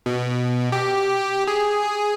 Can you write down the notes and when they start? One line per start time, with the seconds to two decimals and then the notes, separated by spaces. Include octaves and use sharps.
0.06 B2
0.72 G4
1.47 G#4